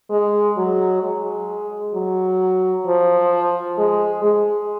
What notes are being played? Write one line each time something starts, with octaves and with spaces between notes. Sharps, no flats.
G#3
F#3
G#3
F#3
F3
G#3
G#3